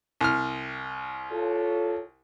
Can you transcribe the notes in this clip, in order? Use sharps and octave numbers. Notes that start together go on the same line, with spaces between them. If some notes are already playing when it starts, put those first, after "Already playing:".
C2 F6
F4 A4 C#5